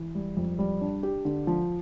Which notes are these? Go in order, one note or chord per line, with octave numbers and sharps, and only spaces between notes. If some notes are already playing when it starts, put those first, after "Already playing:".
Already playing: E3
G3
F2
G3
D4
G4
D3
F3